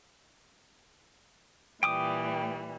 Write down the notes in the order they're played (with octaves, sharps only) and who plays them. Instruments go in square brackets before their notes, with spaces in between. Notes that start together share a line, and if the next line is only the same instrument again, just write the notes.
[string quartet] A#2 E3 G3 [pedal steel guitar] G5 D6 D#6